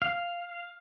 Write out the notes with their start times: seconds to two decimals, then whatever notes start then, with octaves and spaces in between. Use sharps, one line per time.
0.02 F5